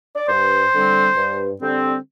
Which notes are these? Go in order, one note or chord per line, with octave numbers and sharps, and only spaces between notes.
D5
G2 C5
D3 G3 C4
G2
D3 G3 C4